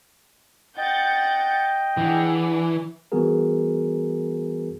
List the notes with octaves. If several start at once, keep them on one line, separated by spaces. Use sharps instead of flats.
D#5 F#5 G5 G6 A6
E3 D4 G#4 F#5
E3 G3 B3 F#4 G#4 A#4